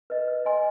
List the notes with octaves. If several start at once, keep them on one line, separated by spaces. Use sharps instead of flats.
B4 D#5
B4
D#5 G#5 C6